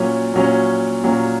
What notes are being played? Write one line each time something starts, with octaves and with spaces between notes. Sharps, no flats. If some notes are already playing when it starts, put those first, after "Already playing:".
Already playing: A#2 F#3 C#4
A#2 F#3 C#4
A#2 F#3 C#4